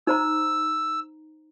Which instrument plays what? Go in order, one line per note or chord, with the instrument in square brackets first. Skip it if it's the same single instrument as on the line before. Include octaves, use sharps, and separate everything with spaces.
[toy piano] D#4 C5 A#5 [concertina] E6